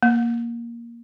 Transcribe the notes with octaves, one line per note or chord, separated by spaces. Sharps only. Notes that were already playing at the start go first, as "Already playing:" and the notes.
A#3